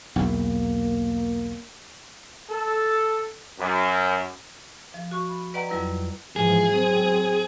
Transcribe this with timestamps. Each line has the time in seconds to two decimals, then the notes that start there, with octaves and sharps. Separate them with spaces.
0.16 B1 E2 A#3
2.50 A4
3.59 F#2
4.94 F3
5.11 F#4 C#6
5.28 B5
5.54 B4 D5 D#5 F#5 G5 A#5
5.69 F2 F#3 G3 E4 B4
6.36 G#2 E3 F3 G#4
6.71 F#3 C4